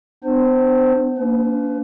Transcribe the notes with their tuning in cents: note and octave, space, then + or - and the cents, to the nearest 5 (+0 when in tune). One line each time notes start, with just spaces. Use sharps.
B3 +35 D4 +30 C5 -5
A#3 +0 D4 -40 B4 +40